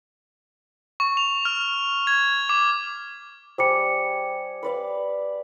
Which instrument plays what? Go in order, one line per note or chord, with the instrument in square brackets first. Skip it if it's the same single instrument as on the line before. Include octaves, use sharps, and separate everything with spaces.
[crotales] C#6
F7
F6
G#6
D6
[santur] G3 G#4 [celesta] C5 D6 C#7
[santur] B4 D5 F5